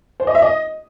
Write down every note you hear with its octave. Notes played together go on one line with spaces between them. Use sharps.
C5
D#5
E5
D#5